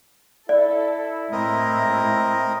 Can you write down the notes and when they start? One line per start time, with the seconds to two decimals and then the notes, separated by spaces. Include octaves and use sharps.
0.49 E4 A4 D5
1.32 A2 C4 A#4 D#5